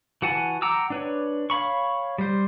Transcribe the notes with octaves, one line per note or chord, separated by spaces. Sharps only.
E3 F#4 F#5 G#5 A5
F#5 G5 A#5 D6 E6
D4 B4 C#5
C#5 F5 B5 C#6
G3 C5